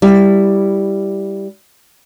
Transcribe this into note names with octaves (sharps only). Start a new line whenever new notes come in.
G3 E4